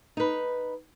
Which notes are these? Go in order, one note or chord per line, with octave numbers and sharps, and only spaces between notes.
D#4 B4